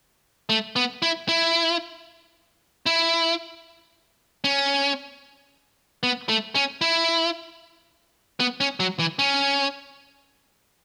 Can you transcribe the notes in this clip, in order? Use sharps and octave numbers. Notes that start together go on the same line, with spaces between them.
A3
B3
E4
E4
E4
C#4
B3
A3
C#4
E4
B3
C#4
F#3
E3
C#4